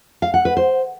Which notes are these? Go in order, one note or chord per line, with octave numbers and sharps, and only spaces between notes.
F5
F#5
B4
C5